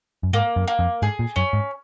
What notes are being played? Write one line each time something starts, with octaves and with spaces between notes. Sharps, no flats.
F#2
G#2 A#3
F#2
A#3
F2
G#2 G#4
A#2
F#2 C#4
G#2